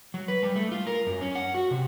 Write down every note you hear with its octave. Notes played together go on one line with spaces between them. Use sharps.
F#3
B4
G3
A3
F4
A#4
F#2
C#4
F#5
F#4
C3